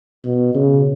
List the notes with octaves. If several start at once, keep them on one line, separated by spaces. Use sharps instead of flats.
B2
C#3